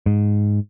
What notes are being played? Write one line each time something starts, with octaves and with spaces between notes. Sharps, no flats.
G#2